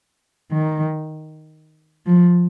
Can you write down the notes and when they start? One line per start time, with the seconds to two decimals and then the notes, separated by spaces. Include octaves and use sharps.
0.52 D#3
2.06 F3